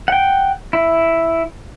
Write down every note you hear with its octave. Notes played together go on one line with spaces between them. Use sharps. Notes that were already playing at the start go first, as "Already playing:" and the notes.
F#5 G5
E4